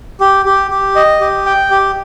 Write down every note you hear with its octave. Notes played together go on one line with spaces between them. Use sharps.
G4
G4
G4
D#5
G4
G5
G4